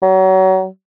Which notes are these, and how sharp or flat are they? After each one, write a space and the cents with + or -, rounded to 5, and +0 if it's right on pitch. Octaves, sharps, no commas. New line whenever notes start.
F#3 +30